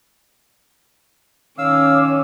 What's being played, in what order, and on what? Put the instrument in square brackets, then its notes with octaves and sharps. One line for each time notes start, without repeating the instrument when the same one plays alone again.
[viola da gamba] D#3 C#4 [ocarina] C#5 [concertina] F5 E6 [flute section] D6